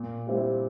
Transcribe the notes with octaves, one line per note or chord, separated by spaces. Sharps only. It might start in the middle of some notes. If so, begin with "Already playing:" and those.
Already playing: A#2
G3 C4 E4 G4